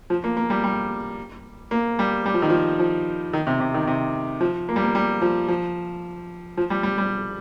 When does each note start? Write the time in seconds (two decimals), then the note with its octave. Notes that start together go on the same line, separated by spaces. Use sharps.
0.10 F3
0.24 A#3
0.37 A#3
0.50 G3
0.64 G3
1.71 A#3
1.99 G3
2.26 G3
2.34 F3
2.42 D#3
2.50 F3
2.79 F3
3.33 D#3
3.47 C3
3.60 C3
3.74 D#3
3.87 C3
4.41 F3
4.69 A#3
4.76 G3
4.82 A#3
4.95 G3
5.21 F3
5.48 F3
6.57 F3
6.70 G3
6.83 G3
6.98 G3